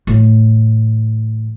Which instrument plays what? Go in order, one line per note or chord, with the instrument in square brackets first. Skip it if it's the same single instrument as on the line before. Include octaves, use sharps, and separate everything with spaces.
[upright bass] A2 E3